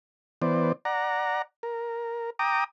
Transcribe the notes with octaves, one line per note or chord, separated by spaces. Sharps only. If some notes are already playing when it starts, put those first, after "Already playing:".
E3 B3 C5 D5
D5 F#5 A#5
A#4
G5 A#5 D6 D#6